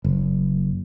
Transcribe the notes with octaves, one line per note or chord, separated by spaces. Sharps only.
F#1